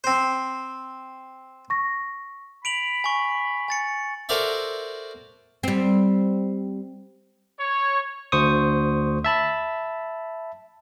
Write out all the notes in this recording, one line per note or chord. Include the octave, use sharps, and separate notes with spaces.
C4 C5
C#6 A#6
B5 D7 F7 F#7
G#5 C#6
G#5 A6 C#7
F#4 A4 A#4 C5 D5 E5
G3 C4
C#5
D2 C5 C#6 D#6
E5 A5 B5